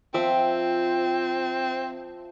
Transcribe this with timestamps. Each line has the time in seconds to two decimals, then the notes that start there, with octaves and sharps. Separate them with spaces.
0.14 F3 C4 E5 G5